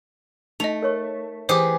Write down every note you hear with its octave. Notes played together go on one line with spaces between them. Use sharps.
A3 D#4 D#5 F7
A#4 C#5 C#6
E3 G4 G#4 C5 D6